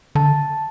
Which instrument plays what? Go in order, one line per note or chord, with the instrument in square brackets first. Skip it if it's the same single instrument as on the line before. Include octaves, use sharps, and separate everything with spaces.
[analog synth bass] D3 [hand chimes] A5